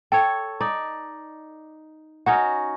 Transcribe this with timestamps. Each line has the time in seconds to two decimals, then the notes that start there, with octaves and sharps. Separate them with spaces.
0.12 A4 C#5 G5
0.61 D#4 D5
2.26 C#4 D#4 F#4 F#5